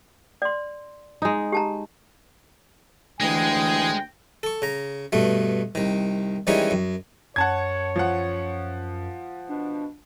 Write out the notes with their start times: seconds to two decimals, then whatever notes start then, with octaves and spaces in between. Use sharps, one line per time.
0.42 D5 C6
1.22 G#3 D#4
1.52 G4 A5 A#5
3.21 D2 E3 G#3 G5 D#6 G#6
4.43 A4 C#6
4.62 C#3 A#5
5.12 G2 B2 A3
5.75 C2 D#3
6.47 D#3 E3 G3 G#3 C#4 D#4
6.71 F#2
7.36 F#2 C#5 F#5 A5 G#6
7.96 F3 F#5
9.49 B2 D4